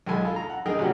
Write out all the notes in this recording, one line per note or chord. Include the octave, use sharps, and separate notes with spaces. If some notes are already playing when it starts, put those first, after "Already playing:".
B1 D#3 G#3 A4 G#5 B5
F4 A4
A#5
F#5
C2 D#4 G#4 A#4 G5
A1 C3 F#3 G4 F#5